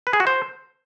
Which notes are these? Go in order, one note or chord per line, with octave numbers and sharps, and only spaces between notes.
B4
G#4
F#4
C5